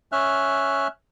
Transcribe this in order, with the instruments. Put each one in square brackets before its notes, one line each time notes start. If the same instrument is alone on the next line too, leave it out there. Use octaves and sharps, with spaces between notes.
[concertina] C#4 E5 F6 F#6